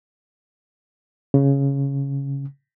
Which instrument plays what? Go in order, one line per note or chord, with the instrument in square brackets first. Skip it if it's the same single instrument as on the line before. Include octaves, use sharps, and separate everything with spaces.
[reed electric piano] C#3